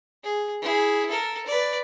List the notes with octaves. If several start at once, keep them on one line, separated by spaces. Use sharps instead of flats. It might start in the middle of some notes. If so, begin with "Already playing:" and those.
G#4
E4 G#4
A4 A#4
B4 D5